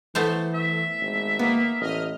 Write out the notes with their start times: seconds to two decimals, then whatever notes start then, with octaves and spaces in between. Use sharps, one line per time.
0.15 E3 A3 B3 C5
0.54 E5
1.01 G#1
1.39 A#3 B3
1.81 A1 D#5 F6